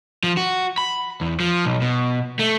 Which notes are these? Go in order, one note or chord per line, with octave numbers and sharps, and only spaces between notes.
F3
F#4
B5
E2
F3
B1
B2
A3